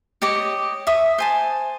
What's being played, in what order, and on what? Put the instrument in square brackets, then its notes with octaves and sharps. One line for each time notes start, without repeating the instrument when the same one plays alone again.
[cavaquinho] G4 C#5 D#5 D6
E5 C#6 D#6
C5 G#5 A5